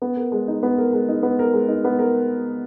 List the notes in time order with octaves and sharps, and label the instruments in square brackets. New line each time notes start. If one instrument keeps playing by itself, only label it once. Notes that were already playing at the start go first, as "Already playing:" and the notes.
[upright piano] B3
A#4
G#3
D#4
B3
A#4
G#3
D#4
B3
A#4
G#3
D#4
B3
A#4